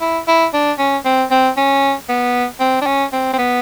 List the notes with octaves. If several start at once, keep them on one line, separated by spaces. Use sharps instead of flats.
E4
E4
D4
C#4
C4
C4
C#4
B3
C4
D4
C#4
C4
C4
B3